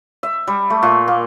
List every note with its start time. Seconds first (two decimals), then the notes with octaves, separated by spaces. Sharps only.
0.23 E5
0.47 G3
0.70 A3
0.83 A#2
1.08 A#3